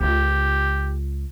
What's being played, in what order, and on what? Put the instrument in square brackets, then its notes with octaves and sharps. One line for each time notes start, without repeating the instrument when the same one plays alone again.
[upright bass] C#2 F4 [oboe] G4